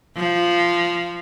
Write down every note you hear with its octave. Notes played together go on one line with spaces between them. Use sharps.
F3